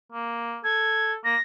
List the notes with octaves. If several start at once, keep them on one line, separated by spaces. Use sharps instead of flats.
A#3
A4 G#6
A#3 A#6